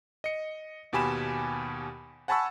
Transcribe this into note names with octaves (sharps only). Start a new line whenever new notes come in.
D#5 C#7
D#2 B2 G4 G#5 B5 E7
F#5 G#5 A5 B5 C#6 E6